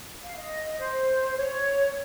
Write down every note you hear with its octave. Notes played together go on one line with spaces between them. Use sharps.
F5
D#5
C5
C#5